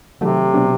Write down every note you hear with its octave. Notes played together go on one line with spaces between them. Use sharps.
C3 D#3 F#3 A3
B2 F#3 B3 D4